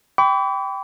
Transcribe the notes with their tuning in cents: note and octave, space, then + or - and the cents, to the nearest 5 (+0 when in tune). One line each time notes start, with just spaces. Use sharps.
G5 +0 B5 +25 D6 -45